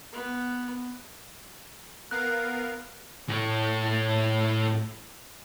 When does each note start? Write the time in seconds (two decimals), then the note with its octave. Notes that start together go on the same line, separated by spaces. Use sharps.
0.13 B3
2.11 B3 A#4 F5 F#6
3.29 A2 C#5